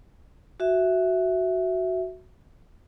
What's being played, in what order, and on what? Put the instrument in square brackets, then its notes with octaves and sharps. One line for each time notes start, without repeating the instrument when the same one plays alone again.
[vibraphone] F#4 E5